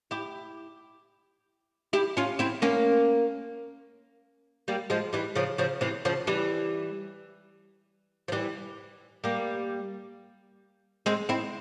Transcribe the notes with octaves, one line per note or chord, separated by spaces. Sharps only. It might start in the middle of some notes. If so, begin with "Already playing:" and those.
E4 G4
E4 G4
C#4 F4
C4 E4
A#3 C#4
G3 A#3
F3 G#3
E3 G3
C#3 F3
C#3 F3
C3 E3
C#3 F3
E3 G3
F3
E3 G3
G3 A#3
G#3 C4
C4 E4